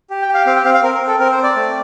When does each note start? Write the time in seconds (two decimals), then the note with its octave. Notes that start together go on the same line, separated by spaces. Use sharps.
0.10 G4
0.22 G5
0.28 G4
0.34 F5
0.46 C4 F5
0.56 G5
0.64 C4 F5
0.74 F5
0.83 C4 A#4
0.95 A#4
1.01 C4
1.07 A4
1.19 C4 A#4
1.31 C5
1.37 C4
1.43 D5
1.56 A3